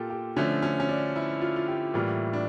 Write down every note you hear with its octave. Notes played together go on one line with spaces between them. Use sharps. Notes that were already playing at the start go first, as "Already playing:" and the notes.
Already playing: A#2 F4 G4 A4 A#4
G4
D3 F3 A3 C#4
C#4
C#4
D4
E4
F4
F4
G4
A2 E3 G3 A#3 F4
D4